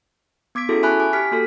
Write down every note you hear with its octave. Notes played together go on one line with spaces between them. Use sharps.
B3 D6 G#6 B6 D7
C#4 E4 F#4 G#4 A4
E5 G#5 A5 B5 C#6 F#6
G#5 D6
G4 F6 B6 D7
A#3 F#4 A4 B6